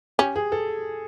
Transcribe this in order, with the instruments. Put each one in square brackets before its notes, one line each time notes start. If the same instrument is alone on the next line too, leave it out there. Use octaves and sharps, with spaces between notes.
[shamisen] C#4 [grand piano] G4
[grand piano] G#4
A4